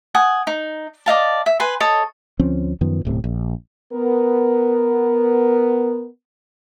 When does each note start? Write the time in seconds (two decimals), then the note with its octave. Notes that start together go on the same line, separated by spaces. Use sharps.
0.15 F#5 G#5 D#6
0.47 D#4
1.06 D5 D#5 F5 A5
1.46 E5
1.60 B4 G#5 C6
1.80 A4 C#5 D#5
2.39 D2 F3 C4 C#4
2.81 F#2 D#3 F3 B3
3.05 D1 B1 A2 C3
3.24 A#1
3.93 B3 A#4